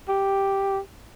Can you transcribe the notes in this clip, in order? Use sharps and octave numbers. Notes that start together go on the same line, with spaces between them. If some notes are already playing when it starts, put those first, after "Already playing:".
G4